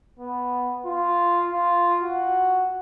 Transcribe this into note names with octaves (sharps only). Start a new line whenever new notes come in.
B3
F4
F4
F#4